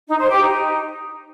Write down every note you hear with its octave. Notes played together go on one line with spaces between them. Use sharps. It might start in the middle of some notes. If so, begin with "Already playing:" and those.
D#4
C5
G4
D#4